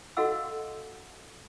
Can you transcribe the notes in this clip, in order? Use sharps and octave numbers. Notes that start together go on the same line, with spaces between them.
F#4 A4 D#5 F5 F#5 E6